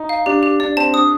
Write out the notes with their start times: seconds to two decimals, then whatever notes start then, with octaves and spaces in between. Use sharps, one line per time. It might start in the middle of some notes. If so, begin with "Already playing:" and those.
Already playing: D#4
0.09 F5
0.26 D4 G4
0.43 G4
0.60 D4 D5
0.77 C4 A5
0.93 D4 D#6